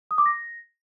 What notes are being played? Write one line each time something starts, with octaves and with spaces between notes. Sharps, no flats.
D#6
D6
A#6